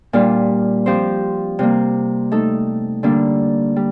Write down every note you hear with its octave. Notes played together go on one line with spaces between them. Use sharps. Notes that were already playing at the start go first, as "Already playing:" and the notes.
A#2 G3 D4 F4
F3 C4 G4 C5
C3 G3 A#3
A3 D#4 A4
D3 G3 A#3 D4
G3